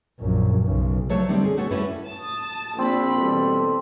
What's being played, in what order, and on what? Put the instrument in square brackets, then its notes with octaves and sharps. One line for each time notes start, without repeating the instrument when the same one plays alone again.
[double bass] A#1 F#2
B1 C#3
[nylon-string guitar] F3 F#3 A3 D4 C#5 A5
D3 G3 C4 D#4
G#4
A3 F#4 A4 C#5
G3 C#4 E4 A4 B4
[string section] A5 D#6
[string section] A#1 D4 B5 [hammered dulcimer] C4
[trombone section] B2 G3 A4 [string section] E3